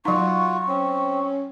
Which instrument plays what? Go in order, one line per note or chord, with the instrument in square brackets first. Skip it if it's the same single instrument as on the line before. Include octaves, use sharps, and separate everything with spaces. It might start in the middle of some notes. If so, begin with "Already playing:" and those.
[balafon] F#3 D#4 [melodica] F4 F#4 [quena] C#6
[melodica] C4 [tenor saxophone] C#4